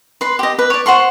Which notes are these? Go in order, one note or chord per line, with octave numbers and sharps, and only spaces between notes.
B4 C6
G4 D#5
B4
C#5 D5
C5 F#5 C6 C#6